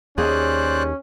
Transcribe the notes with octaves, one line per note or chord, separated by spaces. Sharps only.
D#2 C#4 G#4 C5 D5 F#6